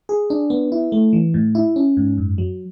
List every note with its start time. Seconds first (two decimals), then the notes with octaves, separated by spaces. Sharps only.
0.09 G#4
0.30 D4
0.50 B3
0.72 E4
0.92 A3
1.13 E3
1.34 A2
1.55 E4
1.76 C#4
1.97 G#2
2.17 F#2
2.38 F#3